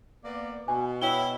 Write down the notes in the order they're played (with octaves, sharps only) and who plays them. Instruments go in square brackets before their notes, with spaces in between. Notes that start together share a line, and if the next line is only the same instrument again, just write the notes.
[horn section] A#3 B3 D5
[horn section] B2 [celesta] G#5
[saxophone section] E4 [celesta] C#5 G5 G7